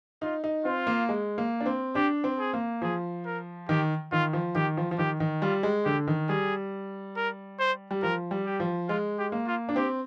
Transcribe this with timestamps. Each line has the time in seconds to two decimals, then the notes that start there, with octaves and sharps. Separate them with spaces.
0.22 D#4 F4
0.44 D#4
0.65 C4 F4
0.87 A#3
1.09 G#3
1.38 A#3
1.60 D4
1.66 C4
1.95 D4 G4
2.24 C4
2.39 G#4
2.54 A#3
2.82 F3 G#4
3.26 A#4
3.69 D#3 G4
4.12 D#3 F4
4.33 F3
4.55 D#3 G4
4.77 F3
4.91 F3
4.98 D#3 G4
5.20 D#3
5.42 G3 F4
5.63 G#3
5.85 D3 G4
6.08 D#3
6.29 G3 G#4
7.16 A#4
7.59 C5
7.91 G3
8.02 F3 A#4
8.31 G3
8.46 G4
8.60 F3
8.89 G#3 F4
9.18 G4
9.32 A#3
9.47 F4
9.69 D4
9.76 C4 G4